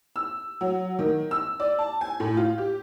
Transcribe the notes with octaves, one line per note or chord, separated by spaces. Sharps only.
E6
F#3
D#3
E6
D5
A5
G#5
A2
F4
G4